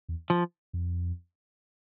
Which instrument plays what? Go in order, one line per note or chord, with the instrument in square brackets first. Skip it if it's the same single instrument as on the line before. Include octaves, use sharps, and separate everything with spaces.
[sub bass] E2
[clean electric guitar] F3
[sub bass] F2